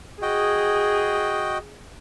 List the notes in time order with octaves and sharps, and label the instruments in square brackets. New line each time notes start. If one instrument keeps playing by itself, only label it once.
[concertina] F#4 D#5 G5 [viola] G#4